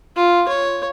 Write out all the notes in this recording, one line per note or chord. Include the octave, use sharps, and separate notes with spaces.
F4
C#5